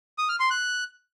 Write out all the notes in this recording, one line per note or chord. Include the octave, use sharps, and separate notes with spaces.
D#6
F6
C6
F#6